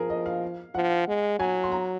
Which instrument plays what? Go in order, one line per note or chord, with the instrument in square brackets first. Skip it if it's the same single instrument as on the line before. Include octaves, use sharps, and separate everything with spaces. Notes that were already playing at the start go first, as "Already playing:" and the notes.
Already playing: [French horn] F3 [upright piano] G#4 A#4
[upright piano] D#5
F5
[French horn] F3 [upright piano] F#5
[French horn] G#3
[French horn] F#3 [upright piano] G#5
[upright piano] C6
A#5